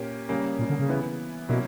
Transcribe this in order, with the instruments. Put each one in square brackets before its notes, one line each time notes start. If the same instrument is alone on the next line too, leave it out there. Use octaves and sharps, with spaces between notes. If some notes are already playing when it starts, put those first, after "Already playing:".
Already playing: [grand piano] A#2 A#3 C#4 G4
C#3 G3 A#3 C#4
[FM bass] A#2
D3
C#3
[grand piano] E3 B3 E4
[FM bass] B2 [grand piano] F#3 A#3 C#4 E4